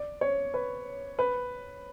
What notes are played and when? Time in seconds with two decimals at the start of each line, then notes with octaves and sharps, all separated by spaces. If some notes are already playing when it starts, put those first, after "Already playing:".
Already playing: D5
0.21 C#5
0.54 B4
1.19 B4